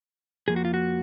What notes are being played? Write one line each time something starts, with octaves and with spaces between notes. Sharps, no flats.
F2 F3 A#3 G#4
F#4
F4
F#4